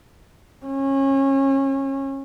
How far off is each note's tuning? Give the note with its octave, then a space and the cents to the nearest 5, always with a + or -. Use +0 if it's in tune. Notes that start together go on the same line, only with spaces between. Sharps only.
C#4 -30